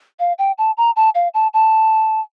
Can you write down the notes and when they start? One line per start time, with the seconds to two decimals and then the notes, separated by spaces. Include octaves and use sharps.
0.19 F5
0.38 G5
0.58 A5
0.77 A#5
0.96 A5
1.15 F5
1.34 A5
1.54 A5